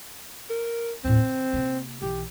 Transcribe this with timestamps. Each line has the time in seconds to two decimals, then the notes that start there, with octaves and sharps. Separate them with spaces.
0.50 A#4
1.04 D#2 A2 C4
1.23 D3
1.53 C3 A#3
2.02 B1 E3 G4